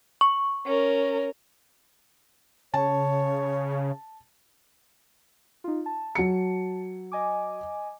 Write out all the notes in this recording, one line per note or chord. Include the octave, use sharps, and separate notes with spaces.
C#6
C#4 A#4
C#3 C#5 A5
D#4 F4
A5
F#3 C#7
D#5 G#5 D6